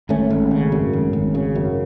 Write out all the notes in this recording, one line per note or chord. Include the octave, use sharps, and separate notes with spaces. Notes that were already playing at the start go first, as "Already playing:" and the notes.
G#1 A3 C#4
G#1
C#3
F#2
G#1
G#1
C#3
F#2